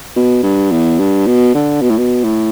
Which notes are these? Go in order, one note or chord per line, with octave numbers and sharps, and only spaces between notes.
B2
G2
E2
G2
B2
D3
B2
A2
B2
A2